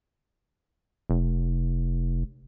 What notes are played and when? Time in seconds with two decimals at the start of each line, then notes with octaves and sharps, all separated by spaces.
1.10 F1